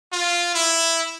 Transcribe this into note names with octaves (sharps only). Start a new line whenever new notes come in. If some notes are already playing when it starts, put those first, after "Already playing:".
F4
E4